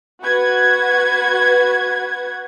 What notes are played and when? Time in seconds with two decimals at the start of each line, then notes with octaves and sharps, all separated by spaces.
0.23 F#4 B4 G#6